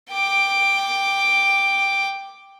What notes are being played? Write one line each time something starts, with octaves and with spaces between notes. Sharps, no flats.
G5 D6